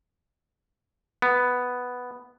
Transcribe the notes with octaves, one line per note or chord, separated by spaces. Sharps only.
B3